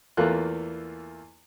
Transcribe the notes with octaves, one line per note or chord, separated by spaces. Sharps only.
E2 E3 A3 A#3 F4 F#6